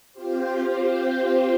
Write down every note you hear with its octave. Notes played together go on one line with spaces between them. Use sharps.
C4 F4 G4 C5